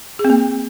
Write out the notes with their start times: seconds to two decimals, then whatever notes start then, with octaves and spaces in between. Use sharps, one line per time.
0.19 G#4
0.25 C4
0.30 A#3